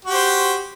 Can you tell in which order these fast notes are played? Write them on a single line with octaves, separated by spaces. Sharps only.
F#4 G4 C5